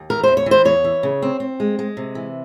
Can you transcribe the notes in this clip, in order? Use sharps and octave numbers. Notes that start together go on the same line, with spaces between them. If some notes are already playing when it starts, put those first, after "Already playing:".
Already playing: D#2
E3 A#4
E2 C5
C#5
E3 C5
E2 C#5
E3
C#3
C4
C4
G#3
G#3
C3
E3